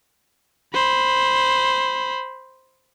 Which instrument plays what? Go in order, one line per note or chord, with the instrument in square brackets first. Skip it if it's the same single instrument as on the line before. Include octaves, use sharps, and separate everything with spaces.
[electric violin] C5 B5